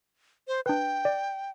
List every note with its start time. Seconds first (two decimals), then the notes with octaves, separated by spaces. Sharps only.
0.48 C5
0.66 D4 B4 G5
1.05 D5